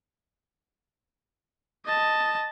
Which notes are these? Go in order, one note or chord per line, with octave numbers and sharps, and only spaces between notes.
D#5 A5